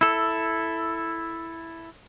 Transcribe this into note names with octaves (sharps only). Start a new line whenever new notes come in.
E4 A4